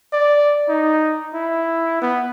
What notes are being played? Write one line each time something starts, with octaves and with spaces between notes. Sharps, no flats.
D5
D#4
E4
B3